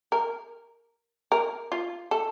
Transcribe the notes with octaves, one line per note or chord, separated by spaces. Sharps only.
A#4
A#4
F4
A4